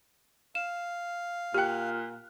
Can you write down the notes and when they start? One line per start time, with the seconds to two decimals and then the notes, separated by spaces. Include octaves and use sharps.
0.55 F5 E7
1.54 A#2 G4 G5 F6 F#6